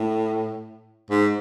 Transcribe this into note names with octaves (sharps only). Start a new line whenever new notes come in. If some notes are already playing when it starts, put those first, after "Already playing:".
Already playing: A2
G#2